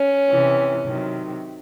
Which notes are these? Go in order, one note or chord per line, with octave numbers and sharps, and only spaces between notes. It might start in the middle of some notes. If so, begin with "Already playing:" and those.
Already playing: C#4
C3 E3
C3 D#3 F#3